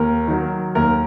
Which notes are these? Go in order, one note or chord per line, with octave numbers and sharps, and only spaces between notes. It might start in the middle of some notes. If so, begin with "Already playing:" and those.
Already playing: D#2 A#4
D#3 F#3
D#2 A#4